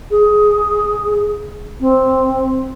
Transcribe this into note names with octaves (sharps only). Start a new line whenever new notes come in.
G#4
C4